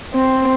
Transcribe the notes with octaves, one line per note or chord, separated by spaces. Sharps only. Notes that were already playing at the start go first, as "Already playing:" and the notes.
C4